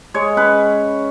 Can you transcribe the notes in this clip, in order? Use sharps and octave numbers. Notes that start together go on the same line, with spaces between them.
G#3 C#5
C#4 B4